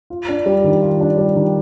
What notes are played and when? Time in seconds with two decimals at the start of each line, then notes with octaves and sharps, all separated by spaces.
0.10 F4
0.29 D4
0.46 G3
0.64 D#3
0.82 F4
1.00 D4
1.18 G3
1.36 D#3